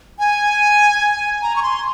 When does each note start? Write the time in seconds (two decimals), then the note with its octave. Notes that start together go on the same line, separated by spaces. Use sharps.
0.19 G#5
1.42 A#5
1.56 C#6
1.63 C6